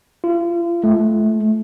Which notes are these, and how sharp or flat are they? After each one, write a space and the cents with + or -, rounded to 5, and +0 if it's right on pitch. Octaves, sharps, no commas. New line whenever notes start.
F4 -35
A3 -25